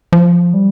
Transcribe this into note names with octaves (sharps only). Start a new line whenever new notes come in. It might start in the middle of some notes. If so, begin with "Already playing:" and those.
F3
G3